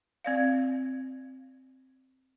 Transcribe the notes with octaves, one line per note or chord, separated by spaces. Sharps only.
C4 D5 F5